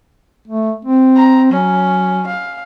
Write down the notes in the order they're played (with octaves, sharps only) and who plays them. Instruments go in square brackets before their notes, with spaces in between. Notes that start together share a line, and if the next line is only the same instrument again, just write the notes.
[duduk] A3
C4
[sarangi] A#5
[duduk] F#3 [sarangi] C#4
[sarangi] F5